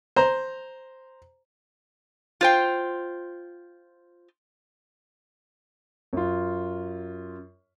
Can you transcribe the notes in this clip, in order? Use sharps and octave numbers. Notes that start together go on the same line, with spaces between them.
C5 A#5
F4 C5 G5
F#2 F4